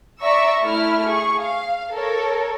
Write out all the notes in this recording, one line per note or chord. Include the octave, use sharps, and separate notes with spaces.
D5 E5 A#5 C#6 E6
A3 E4 F6
G#4 C#6
F5
A4 A#4 C#5